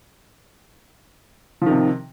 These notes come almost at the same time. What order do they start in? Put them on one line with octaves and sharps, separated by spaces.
F3 D#3 C3